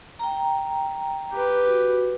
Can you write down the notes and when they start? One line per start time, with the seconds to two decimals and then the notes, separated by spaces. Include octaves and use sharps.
0.19 G5 A#5
1.32 G4 B4
1.67 F#4